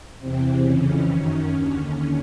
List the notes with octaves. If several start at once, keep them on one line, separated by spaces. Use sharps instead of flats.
E2 C3 E3 C4
F2 C#3 E3 C#4
F#2 D#3
D#2 D3